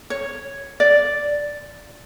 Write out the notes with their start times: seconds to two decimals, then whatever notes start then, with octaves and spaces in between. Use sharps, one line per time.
0.10 C#5
0.80 D5